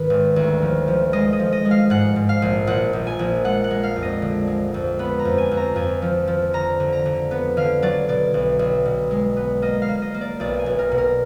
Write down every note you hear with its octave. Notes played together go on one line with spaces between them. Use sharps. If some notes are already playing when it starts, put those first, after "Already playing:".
Already playing: G#2 D#3 G#4 B4
G#1
D2
F3
F3
G#3 D#5
D#5
F3
D#5
G#3
F5
G#2 F#5
G#2
F5
A#1
A#1 F#5
A#1
G#5
A#1
G#3 F#5
F#5
G#3
F5
F2
D#5
D3
G#3
F2
B3 B5
A#5
F2
G#5
F2
A#5
F2 G#5
F3
F3
D3 A#5
D3
A#5
D3
B3
D3 F5
F#3 D5
B2 D5
B1
B1
B2
G#3
B3
A#3 D#5
F5
A#3
D#5
A#3
D5
B1 D5
G#5
B1
A#4
B2
A#4